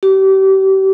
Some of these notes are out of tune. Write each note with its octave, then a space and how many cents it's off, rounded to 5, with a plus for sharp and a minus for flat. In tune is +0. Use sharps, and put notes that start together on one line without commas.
G4 -35